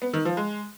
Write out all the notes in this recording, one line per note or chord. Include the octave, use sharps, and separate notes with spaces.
B3
D#3
F3
G#3